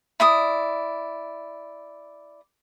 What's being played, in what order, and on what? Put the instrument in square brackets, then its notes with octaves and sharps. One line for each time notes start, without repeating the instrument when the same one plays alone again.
[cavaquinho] E4 D5 D#6